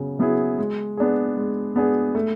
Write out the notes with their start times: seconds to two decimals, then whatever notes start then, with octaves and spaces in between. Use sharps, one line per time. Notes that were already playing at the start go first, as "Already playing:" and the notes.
Already playing: C#3 F#3 B3
0.19 F#3 B3 E4 G#4
0.58 G#3
0.97 B3 D4 G#4
1.37 G#3
1.76 B3 D4 G#4
2.15 A3